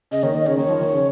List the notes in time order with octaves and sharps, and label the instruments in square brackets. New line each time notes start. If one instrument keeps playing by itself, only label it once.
[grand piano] C#3 [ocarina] D#5
[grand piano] D#3 [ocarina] C#5
[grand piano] D#3 [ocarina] D#5
[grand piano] C#3 [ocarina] C#5
[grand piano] D#3 [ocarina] C#5
[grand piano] F3
D#3
C#3